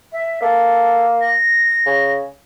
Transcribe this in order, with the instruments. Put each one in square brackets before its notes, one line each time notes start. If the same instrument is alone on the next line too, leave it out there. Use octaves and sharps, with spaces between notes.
[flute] E5
[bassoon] A#3 [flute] A4
[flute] A#6
[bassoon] C#3